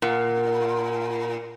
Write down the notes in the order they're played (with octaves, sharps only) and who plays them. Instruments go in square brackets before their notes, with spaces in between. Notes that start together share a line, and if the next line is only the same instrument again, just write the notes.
[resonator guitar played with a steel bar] A#2 [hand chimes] A#4 F#5